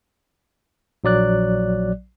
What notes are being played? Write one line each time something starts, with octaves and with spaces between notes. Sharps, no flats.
A#1 F#3 D5 F#6